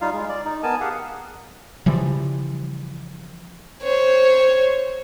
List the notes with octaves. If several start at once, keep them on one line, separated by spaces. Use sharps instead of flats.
G3 D#4 F4 F5
G#3
D5
D#4
B3 A#4 G#5 A5
G4 G#4 F5 F#5
C#3 E3 F3 G3
C5 C#5